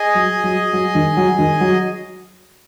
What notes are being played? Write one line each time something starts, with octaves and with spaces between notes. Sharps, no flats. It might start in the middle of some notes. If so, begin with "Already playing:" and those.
Already playing: G#4 D#5 G#5
F#3
F#3
F#3
D#3
F#3
D#3
F#3